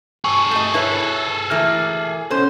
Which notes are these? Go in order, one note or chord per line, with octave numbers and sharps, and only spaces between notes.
G#4 A4 C#6
A3 D#5
E4 B4 C#5
E3 A3 A#3 F6
B2 C#4 A4 C5